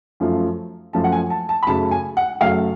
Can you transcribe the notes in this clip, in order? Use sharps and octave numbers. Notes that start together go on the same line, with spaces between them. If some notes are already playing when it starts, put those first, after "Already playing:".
F#2 F3 A3 F4
F#2 F3 A3 F4 A5
F#5
G#5
A5
A5
B5
F#2 C#3 F#3 A3 A5
G#5
F#5
F#2 C#3 F#3 A3 F5